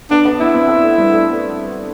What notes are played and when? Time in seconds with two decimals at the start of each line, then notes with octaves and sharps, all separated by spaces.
0.11 B3 D4
0.25 B3
0.40 D4 E4
0.55 C4
0.69 B3
0.84 A3
0.98 G3
1.12 A3